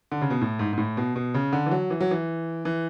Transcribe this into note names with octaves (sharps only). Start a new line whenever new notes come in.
D3
C#3
B2
A2
G#2
G#2
A2
B2
B2
C#3
D3
E3
F#3
E3
F#3
E3
E3